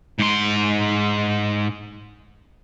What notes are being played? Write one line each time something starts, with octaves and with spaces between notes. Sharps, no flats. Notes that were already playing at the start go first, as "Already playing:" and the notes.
G#2 C6